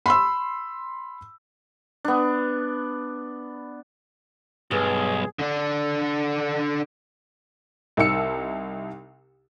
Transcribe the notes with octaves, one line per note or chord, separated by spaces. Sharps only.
B5 C6 E6
B3 D4
B1 G2 G3 G#4
D3 D4
C2 D#4 A5 E6 C#7